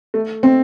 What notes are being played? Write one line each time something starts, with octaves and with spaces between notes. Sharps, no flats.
A3
C4